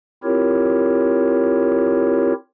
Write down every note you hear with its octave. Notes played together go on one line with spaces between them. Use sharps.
C4 E4 F4 G4 A#4 C#5